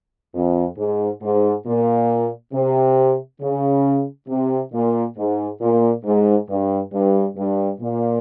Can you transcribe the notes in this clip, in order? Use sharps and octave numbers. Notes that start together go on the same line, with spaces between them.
F2
G#2
G#2
A#2
C3
C#3
C3
A#2
G#2
A#2
G#2
G2
G2
G2
A#2